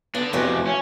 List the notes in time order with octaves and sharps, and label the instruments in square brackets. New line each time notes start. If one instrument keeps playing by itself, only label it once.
[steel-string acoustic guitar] B3 [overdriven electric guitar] D4 A4
[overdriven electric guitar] F2 C3 [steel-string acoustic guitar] E3 A3 F#4
[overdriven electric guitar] C#4